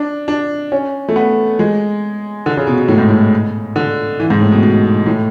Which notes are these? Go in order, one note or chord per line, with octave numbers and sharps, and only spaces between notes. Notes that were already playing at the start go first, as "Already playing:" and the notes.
Already playing: D4
D4
C#4
A3
B3
G#3
D3
C#3
B2
B2
A2
G#2
A2
D3
E3
G#2
A2
B2
B2
A2